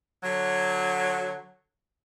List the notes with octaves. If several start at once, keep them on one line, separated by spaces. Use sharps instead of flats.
D3 F#3